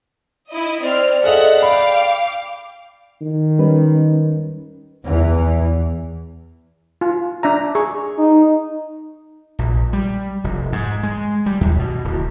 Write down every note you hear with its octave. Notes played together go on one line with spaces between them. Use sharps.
E4 D#5
C4 D5 F6
G#4 A4 D#5 E5 F#5
F5 G5 B5 D6
D#3
G3 C#4 B4
E2 E3
F4
D4 E5 A#5
G#4 C#6
D#4
A#1
G3
F1
G#2
G#3
G3
D#2
B2
D1